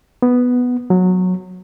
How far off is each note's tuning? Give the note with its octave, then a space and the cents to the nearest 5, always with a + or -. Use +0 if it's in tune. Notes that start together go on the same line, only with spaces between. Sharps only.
B3 +0
F#3 -15